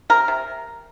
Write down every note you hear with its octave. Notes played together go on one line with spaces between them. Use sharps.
C3 A#4
C3